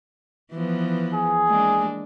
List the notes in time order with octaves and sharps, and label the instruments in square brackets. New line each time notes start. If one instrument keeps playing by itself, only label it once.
[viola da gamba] E3 F3 B3
[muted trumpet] G#4
[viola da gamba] G#3 A#3 D4